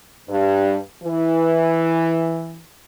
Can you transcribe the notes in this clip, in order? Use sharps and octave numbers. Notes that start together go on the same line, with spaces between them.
G2
E3